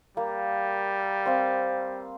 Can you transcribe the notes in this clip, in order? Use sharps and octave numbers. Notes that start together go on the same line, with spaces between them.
G3 A#3
C4 F5